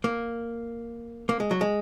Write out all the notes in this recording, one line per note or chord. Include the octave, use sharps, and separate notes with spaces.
A#3
A#3
G#3
F#3
G#3